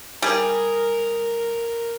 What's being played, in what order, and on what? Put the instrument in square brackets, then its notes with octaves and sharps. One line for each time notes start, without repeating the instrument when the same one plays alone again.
[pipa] G3 G#4 [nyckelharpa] A#4